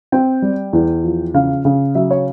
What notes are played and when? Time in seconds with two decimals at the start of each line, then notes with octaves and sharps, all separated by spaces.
0.12 C4 G5
0.42 G3
0.73 E2
1.04 F3
1.34 C#3 F5
1.65 C#3
1.95 F#3 E5
2.11 C#5